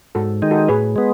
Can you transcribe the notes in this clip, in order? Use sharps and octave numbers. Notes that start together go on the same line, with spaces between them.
G#2 F#4 A4
D#3 G#3 D#4
F#4 A4
A2 G#4 B4
G#3 B3